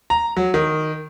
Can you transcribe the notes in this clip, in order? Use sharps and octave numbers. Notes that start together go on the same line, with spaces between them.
A#5
F#3
D#3